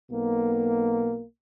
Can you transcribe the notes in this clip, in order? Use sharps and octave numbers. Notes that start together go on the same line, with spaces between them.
B1 B2 A#3